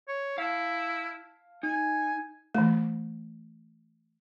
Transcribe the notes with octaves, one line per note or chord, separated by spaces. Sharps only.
C#5
E4 F5 A5
D#4 G#5
E3 A3